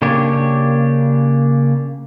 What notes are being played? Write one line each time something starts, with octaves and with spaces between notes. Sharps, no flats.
C#3 A#3 D4 G4 C#5